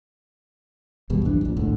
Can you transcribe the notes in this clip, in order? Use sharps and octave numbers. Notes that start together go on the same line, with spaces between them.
G#1 E2 B2 G3
B1 F2 E3 D4
A#1 A#2
G#1 C#2 A2 D3